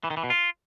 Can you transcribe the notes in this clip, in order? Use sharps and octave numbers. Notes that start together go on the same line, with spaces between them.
E3
D#3
E3
B2
F4